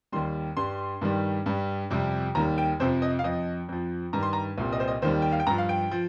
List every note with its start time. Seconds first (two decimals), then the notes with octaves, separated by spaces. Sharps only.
0.12 D#2 D#3 G3 C6
0.57 G2 G3 C6
1.01 G2 D#3 G3
1.46 G2 G3
1.90 F2 C3 G3
2.35 D#2 D#3 G3 A#5
2.58 G5
2.80 F2 C3 F3 C5
3.02 D#5
3.19 F5
3.24 F2 F3 D#5
3.69 F2 F3
4.13 G2 D#3 G3 A#5
4.23 C6
4.33 A#5
4.58 C2 A#2 G3
4.72 D#5
4.80 C5
4.87 D#5
5.02 D#2 D#3 G3 C5
5.22 G5
5.32 F5
5.40 G5
5.47 G2 F3 A#5
5.58 F5
5.69 G5
5.91 F3